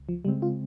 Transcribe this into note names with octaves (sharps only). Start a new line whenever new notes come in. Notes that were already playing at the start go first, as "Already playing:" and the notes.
Already playing: C#2
F3
C#3 G3 G#3 C4
F4